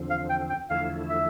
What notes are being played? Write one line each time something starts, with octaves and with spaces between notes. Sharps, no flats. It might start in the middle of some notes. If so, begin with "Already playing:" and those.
Already playing: E2 D3 F3 C4
F5
G5
G5
E2 D3 F3 A3 E4 F5
E5